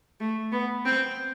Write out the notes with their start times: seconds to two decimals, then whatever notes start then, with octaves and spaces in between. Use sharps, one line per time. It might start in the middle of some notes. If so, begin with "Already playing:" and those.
0.20 A3
0.52 B3
0.85 C4